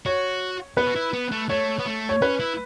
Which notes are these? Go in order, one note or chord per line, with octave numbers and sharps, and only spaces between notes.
F#4 C#5
B3 B4
F#4
E4
B3
A3
A3 C#5
B3
A3
C#5
C#4 B4
E4